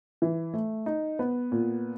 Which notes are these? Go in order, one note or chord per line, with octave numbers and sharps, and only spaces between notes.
E3
A3
D#4
B3
A#2